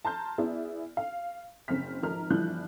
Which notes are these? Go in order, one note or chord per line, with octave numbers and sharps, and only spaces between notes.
A5 A#5 C6 F6 G6
B3 E4 G#4 D5
F5
F#1 C4 F6 B6
G#1 F3 A#4 F6
G1 G2 E3 F3 F#6 G6